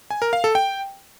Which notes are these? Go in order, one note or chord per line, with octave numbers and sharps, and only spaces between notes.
G#5
A#4
F5
A4
G5